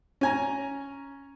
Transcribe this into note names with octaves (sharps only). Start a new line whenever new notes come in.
C#4 G#5 A#5